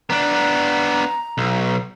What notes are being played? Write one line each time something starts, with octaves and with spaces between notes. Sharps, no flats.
B3 D4 A#5
B1